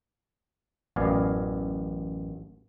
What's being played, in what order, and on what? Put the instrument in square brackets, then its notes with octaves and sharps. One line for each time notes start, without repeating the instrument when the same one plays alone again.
[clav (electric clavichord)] A1 F#2 B3 D5 F5 G#5